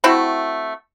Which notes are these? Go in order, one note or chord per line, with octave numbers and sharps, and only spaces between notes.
A3 C4 E4 F#4